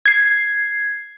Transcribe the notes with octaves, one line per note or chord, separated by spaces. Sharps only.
G#6 C7